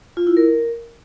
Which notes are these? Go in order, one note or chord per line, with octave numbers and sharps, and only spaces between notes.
F4
E4
A#4